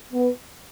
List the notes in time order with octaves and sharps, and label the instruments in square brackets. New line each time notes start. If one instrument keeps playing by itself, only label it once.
[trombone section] B3